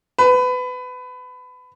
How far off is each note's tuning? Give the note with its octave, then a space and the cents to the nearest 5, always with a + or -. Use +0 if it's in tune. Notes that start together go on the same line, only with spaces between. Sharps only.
B4 +25